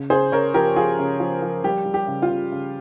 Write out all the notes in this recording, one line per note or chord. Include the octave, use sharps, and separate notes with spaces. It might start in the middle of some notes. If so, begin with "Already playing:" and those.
Already playing: C#3
C#3 G#4 C5
C#3 A#4 C#5
F3 G4 A#4
F3 F4 G#4
C#3
F3
F3
G3 G4
G3
G4
C#3
F4
C#3
C#3